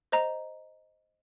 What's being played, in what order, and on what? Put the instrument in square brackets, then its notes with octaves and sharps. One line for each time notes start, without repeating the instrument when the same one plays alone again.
[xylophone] C5 D#5 A#5